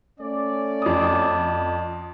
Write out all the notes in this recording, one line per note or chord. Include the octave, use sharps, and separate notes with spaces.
A3 C#4 D5
F2 D#6